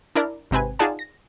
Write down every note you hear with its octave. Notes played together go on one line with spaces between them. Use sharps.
D4 E4 A#4 D5
G#1 C3 C4 B4 G#5
D#4 F4 G#4 D5 F#5 A5
A#6